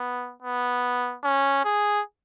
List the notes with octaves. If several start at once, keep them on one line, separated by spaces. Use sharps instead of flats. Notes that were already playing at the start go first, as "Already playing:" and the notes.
Already playing: B3
B3
C#4
G#4